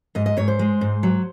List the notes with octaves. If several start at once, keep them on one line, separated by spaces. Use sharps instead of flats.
G#2 D#5
D#5
G#2 C#5
C5
G#3
G#2
F#3